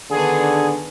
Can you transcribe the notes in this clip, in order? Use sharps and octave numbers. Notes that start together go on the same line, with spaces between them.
D3 D#3 B3 D4 G#4